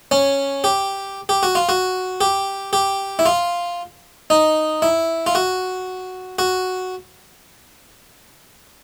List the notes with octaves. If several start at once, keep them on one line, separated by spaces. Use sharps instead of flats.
C#4
G4
G4
F#4
F4
F#4
G4
G4
E4
F4
D#4
E4
F4
F#4
F#4